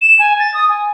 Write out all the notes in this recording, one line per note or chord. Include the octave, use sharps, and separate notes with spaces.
E7
G#5
A6
D#6
G#5